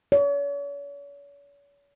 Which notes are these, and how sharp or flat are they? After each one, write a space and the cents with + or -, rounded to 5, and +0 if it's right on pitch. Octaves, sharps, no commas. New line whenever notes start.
C#5 +40